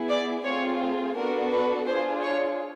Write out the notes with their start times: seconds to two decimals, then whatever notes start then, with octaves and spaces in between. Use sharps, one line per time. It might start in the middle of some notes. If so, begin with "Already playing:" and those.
Already playing: B3 E4 G#4
0.09 D5
0.44 A3 C4 F4 G#4 C#5
1.15 B3 D4 F#4 A4 A#4
1.51 B4
1.87 D4 F4 G#4 C5
2.22 C#5